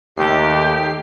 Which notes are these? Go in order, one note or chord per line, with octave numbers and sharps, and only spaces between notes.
D#2 D#3 A3 G4 C7